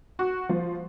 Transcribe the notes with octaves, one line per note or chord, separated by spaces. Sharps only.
F#4
F3